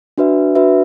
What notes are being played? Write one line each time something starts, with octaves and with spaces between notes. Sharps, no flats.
D4 F#4 B4 E5
D4 F#4 B4 E5